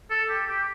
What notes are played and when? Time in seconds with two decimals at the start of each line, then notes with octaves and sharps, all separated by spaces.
0.10 A4
0.29 G4
0.48 G4